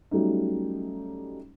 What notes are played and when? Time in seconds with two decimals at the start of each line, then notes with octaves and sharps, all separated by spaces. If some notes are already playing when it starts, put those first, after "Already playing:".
0.11 F#3 G3 A3 C#4 D#4